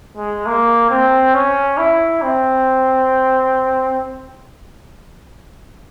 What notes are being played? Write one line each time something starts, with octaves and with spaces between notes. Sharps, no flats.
G#3
A#3
C4
C#4
E4
C4